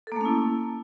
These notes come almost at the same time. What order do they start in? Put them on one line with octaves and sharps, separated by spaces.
A4 A#3 A3 C#4 E4